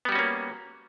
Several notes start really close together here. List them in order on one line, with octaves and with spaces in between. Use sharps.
B3 G3 F#4 C#4 A#3